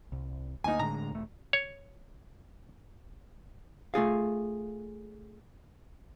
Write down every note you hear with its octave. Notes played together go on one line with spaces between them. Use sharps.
C2
D2 A#3 D#4 G#5
A2 D3 G#3 A#5
E1 A3
C#5
A3 F4 G#4 F5